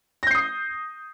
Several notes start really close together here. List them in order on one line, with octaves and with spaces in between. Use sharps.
A#6 G6 C7 D#6